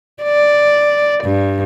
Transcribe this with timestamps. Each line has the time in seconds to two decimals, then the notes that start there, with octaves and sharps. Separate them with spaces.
0.23 D5
1.23 G2